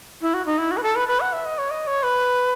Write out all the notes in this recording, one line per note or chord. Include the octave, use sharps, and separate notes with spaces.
E4
F#4
D#4
E4
F#4
B4
A4
B4
B4
F#5
E5
D#5
C#5
D#5
C#5
B4